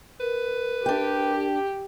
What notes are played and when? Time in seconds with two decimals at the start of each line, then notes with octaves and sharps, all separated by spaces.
0.20 A#4 B4
0.86 D4 G4 G5